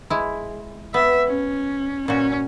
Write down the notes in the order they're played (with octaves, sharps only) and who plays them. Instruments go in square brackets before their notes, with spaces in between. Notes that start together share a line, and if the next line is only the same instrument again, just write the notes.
[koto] G#3 E4
[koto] B3 [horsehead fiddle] E5
[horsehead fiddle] C#4
[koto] A#2 F#4 [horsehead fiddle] C#4